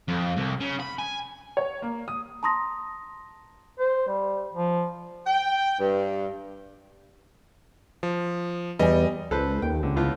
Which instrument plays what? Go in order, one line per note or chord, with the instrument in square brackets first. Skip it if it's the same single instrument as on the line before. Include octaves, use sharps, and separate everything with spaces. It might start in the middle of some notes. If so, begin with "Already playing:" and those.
[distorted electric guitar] F2
C2
C#3
B5
G#5
[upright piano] C#5
A#3
D#6
[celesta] A5 A#5 C6 D#6 A#6
[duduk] C5
G3
F3
[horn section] G5
G2
[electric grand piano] F3
[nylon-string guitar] E2 G#5 [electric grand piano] G3 D#5
[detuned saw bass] C#2 [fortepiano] A4 B4 C5
[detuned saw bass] D#2 [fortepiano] G5
[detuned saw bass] C#2 [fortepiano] D3
[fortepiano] A2 B3 F4